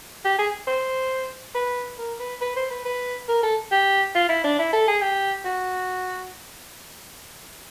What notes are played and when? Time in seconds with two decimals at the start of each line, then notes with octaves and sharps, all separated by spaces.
0.25 G4
0.39 G#4
0.67 C5
1.55 B4
1.98 A#4
2.20 B4
2.41 B4
2.56 C5
2.71 B4
2.85 B4
3.28 A#4
3.43 A4
3.71 G4
4.15 F4
4.29 E4
4.44 D4
4.59 E4
4.73 A4
4.88 G#4
5.01 G4
5.45 F#4